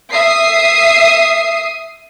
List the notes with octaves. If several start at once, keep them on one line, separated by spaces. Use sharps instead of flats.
E5 D#6 C7